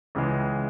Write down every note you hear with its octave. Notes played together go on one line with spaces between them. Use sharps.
C#2 C#3 E3 G#3